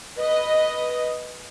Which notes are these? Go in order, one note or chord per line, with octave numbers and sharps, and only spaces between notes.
B4 D#5